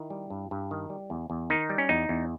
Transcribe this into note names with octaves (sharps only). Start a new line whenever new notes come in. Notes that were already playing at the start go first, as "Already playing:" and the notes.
Already playing: D#3 E4
G3
G2
G2
D#3
G3
E2
E2
D#3 D#4
G3
C#4
E2 D#4
E2